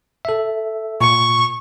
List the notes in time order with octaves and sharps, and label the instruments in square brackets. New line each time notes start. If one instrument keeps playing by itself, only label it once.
[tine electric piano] A4 E5
[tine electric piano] A#2 C#7 [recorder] C#6